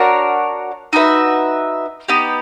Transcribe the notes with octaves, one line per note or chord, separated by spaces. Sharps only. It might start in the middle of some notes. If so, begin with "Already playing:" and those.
Already playing: D4 F#4 A#4 C#5
D#4 F#4 B4 E5
B3 D#4 G4